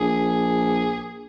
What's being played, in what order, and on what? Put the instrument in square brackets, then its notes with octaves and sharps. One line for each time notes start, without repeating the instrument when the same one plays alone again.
[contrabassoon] A#1 [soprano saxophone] G#4